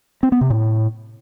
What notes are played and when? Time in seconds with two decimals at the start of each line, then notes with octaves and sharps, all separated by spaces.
0.23 C4
0.32 B3
0.41 C3
0.50 A2